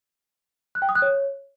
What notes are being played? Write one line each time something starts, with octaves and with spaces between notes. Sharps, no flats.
F#6
G5
D#6
F#6
C#5